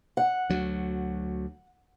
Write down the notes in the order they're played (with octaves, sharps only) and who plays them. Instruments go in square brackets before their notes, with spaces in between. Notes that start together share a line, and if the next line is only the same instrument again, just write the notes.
[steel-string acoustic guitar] F#5
[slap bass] D2 F#3